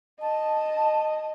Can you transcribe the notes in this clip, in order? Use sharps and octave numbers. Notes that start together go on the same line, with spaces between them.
D#5 A5